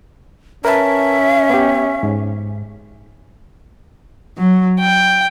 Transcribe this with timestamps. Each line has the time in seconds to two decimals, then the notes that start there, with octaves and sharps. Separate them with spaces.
0.65 C#4 A#4 B4 E5 A5
1.50 B3 G4
2.03 G#2
4.38 F#3
4.80 G5